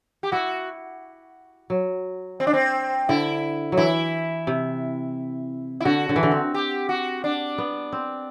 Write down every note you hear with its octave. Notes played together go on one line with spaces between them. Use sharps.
G4
E4 F#4
F#3
C4
D4
C4
D3 E4
F#3
E3 E4
C3
E4
D3 F#4
D3
E3
D3
C4
G4
F#4
D4
B3
C4